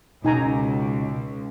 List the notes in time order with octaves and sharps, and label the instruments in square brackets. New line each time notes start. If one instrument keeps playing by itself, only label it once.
[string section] C#2 [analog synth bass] B2 [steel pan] D#4 G#5 A#5